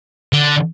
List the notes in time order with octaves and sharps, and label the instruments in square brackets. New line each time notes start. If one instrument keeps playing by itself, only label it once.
[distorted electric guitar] D3